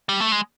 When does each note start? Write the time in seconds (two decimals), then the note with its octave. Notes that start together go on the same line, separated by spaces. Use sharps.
0.09 G3
0.20 A3
0.32 G#3